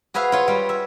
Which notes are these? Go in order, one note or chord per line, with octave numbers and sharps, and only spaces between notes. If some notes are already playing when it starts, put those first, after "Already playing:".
F#4 G#4 B4 E5 F5
F4 C#5
G3 F4
E5